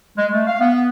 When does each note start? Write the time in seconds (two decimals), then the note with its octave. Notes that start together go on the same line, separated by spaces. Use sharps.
0.17 G#3
0.32 A3
0.46 F5
0.61 B3